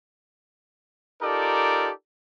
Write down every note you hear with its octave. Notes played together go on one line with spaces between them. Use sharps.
D#4 F4 G4 A4 A#4 D5